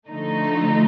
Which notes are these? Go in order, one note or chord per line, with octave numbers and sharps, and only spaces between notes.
D3 F3 A3 D#4